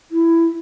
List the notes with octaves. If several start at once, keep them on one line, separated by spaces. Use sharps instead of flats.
E4